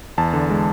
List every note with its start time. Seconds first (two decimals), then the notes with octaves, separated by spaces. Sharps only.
0.18 E2 A5
0.33 D3
0.50 G#3